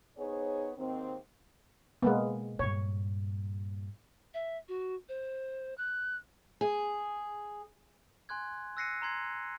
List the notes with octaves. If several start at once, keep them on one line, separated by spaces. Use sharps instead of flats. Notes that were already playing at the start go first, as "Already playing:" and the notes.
B3 D#4 G#4 C5 C#5
D#2 G#2 D#3 C4
B2 G#3 A#3 B3
G2 A#2 C#5
E5
F#4
C5
F#6
G#4
G#5 C6 F#6 G#6
E6 F#6 A#6 C7 C#7 D#7
A#5 C6 G#6 C7